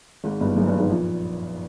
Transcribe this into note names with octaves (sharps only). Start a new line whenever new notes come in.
G#1 G#2
G1 G2
F#1 F#2
G1 G2
G#1 G#2
A#1 A#2